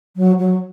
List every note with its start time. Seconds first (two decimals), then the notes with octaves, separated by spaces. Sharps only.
0.17 F#3
0.39 F#3